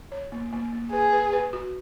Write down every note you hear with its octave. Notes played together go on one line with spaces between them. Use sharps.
C#5
A#3
A#3
A#3
G#4 B4
B4
B4
F#4